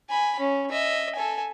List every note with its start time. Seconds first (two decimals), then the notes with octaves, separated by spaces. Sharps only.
0.10 G#5 B5
0.40 C#4
0.70 D#5 E5
1.15 A4 G#5